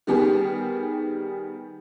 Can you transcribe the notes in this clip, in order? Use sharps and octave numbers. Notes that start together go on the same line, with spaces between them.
D#3 G3 B3 G4 G#4